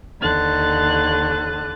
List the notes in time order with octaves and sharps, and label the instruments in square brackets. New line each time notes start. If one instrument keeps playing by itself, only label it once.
[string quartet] D#2 D3 F#6 A6